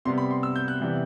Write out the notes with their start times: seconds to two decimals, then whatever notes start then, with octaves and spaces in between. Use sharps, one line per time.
0.05 C3 G3 B3 C6
0.18 B5
0.31 C6
0.43 E6
0.56 G6
0.68 F#6
0.81 C3 E3 G3 B3